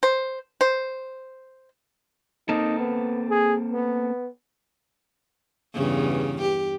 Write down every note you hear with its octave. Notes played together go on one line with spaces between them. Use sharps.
C5
C5
A#3 C4 D#4 A4
B3
G#4
B3
E2 G2 C#3
G4